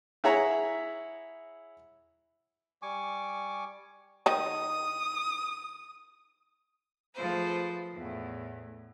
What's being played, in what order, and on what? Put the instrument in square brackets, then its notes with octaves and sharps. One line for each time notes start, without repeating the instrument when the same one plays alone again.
[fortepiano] E4 G#4 C#5 E5 F#5 A#5
[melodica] G3 G#5 C#6 D6
[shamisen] D#3 D#4 [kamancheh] D#6
[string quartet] F3 A3 F4 G#4 B4 C5
E2 A2